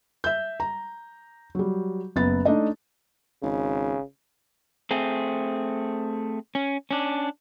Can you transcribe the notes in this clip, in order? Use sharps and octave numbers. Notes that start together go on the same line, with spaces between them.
E5 G6
A#5
F#3 G3
F#1 B3 A6
A3 D4 D#4 D#5
G#1 C#3
A3 C4 G#4
C#4
C#4 D4